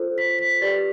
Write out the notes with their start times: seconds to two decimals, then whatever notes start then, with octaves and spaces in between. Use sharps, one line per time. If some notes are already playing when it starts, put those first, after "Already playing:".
Already playing: F4 A4 C5
0.18 B6
0.39 B6
0.61 G4 B4 D5 A6